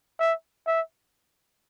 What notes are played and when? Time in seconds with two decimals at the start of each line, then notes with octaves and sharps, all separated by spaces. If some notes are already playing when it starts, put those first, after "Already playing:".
0.19 E5
0.67 E5